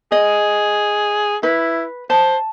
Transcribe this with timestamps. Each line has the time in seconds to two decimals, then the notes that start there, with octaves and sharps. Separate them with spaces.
0.12 G#4 D#5
1.43 E4 B4
2.10 C5 A5